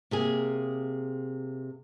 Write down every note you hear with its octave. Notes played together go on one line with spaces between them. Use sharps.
C3 A#3 G#4